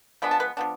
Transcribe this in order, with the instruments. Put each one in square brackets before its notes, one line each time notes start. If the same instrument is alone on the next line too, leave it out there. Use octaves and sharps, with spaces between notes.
[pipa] F3 G#3 B3 D4 B5
A5
B4
F3 B3 D4